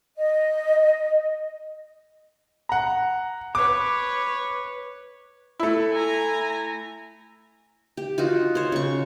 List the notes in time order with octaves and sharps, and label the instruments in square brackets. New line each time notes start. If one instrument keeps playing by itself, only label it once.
[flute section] D#5
[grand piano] F#5 A#5
[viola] B4 C#5 [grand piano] D6
[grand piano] A3 E4
[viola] G#5 A#5
[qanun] G4
D#4 F4 F#4
C5 C#5
C#3 C#6